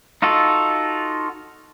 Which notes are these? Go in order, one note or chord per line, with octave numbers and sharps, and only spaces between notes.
D#4 F4 F#4 A4